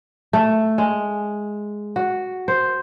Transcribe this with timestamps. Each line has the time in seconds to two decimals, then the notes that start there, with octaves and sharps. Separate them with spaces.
0.33 A3
0.78 G#3
1.96 F#4
2.48 C5